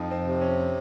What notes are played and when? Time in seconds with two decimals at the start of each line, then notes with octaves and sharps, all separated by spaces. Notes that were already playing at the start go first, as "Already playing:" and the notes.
Already playing: F2 D#4
0.11 C4
0.26 C3
0.41 C#4